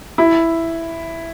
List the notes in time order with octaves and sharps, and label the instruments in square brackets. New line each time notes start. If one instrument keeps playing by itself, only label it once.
[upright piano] E4